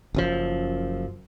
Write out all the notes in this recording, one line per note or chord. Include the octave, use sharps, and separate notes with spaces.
F#1 F#2 F3